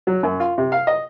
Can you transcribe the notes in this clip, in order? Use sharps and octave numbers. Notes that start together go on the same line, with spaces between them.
F#3
F#2
F4
C3
F5
D#5